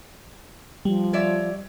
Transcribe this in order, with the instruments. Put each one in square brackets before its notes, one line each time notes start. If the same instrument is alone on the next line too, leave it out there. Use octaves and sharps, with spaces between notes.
[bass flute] F3 [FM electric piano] G3
[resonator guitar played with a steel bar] C#5 D5 E5